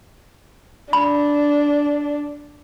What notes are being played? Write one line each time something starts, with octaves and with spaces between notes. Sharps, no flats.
D4 B5